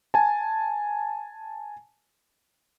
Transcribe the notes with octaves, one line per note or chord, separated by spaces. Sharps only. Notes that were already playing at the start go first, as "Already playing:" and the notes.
G#5 A5